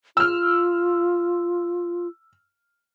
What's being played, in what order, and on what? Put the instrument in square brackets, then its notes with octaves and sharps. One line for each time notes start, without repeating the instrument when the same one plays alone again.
[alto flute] F4 [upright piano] E6 F6